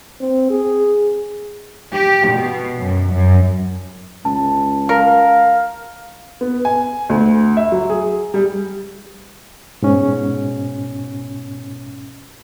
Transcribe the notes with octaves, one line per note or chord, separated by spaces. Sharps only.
C4
G#4
G4
B2
F#2
F#2
C#2 A5
A#4 F5
B3
G#5
D2
E5
F#3
G#4
G3
G#2 B2 C#4